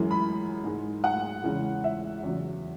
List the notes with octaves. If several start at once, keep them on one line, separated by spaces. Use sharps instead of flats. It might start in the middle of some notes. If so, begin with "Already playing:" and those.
Already playing: F#2 E3 G#3
B5
G#2 G#3
F#5
E2 C#3 E3 G#3
E5
E2 C#3 F#3